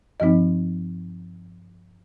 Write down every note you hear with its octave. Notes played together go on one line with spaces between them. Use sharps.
G2 F3 C4 D#4 D#5